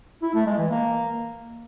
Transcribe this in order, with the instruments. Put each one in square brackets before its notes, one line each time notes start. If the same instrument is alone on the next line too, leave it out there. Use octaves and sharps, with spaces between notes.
[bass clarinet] E4
A3
G#3
E3
A#3